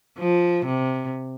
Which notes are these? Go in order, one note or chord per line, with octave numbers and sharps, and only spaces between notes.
F3
C3